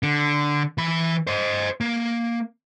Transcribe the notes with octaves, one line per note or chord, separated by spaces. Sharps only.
D3
E3 B5
C5 D#5
A#3